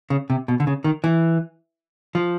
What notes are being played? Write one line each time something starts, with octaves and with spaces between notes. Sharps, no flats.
C#3
C3
B2
D3
C#3
D#3
E3
F3